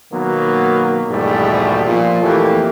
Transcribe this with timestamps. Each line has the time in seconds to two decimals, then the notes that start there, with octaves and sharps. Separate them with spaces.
0.12 B2 D#3 F#3 A#3 B3
1.09 A#1 E2 G#2 B2 G3 A3
1.86 A#2 F3 F4
2.22 F2 E3 A3 A#3 G4